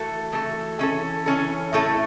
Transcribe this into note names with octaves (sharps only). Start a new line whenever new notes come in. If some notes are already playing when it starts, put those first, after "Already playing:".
Already playing: E3 A3 F#4 A4
E3 A3 F#4 A4
E3 C#4 A4
E3 C#4 A4
A2 A3 E4 A4